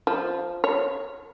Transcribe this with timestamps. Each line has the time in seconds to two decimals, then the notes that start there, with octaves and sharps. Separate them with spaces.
0.07 F3
0.64 C#5